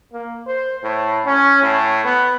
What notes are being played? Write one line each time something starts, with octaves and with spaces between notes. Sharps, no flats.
A#3
C5
A2
C#4
A2
B3